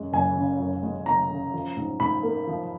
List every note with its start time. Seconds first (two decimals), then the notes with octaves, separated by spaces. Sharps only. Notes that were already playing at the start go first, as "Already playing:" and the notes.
Already playing: F#2 G#3
0.13 F#1 G#5
0.36 C#3
0.60 F#2
0.83 G#3
1.06 F#1 A#5
1.30 C#3
1.54 F3
1.77 G#2
2.00 G#2 B5
2.23 A#3
2.47 F3